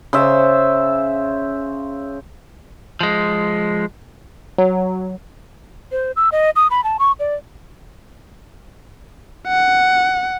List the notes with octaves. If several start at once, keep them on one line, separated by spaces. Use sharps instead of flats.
C#3 C5 E5
F3 G#3
F#3
C5
E6
D#5
D#6
B5
A5
C#6
D5
F#5